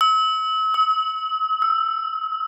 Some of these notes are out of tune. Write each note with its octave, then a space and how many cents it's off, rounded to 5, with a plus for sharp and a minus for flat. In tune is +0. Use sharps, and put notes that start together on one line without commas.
E6 -40
D#6 +45
E6 +10